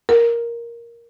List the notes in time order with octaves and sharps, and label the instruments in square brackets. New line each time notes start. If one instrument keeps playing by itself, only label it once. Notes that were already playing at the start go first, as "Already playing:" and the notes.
[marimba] A#4